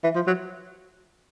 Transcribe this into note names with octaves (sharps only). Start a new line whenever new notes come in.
E3
F3
F#3